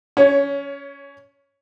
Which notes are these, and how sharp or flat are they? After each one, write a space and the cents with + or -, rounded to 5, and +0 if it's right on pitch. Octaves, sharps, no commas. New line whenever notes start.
C#4 +20 C#5 +0